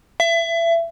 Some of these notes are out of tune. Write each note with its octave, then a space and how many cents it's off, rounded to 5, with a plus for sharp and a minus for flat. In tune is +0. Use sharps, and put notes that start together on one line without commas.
E5 +25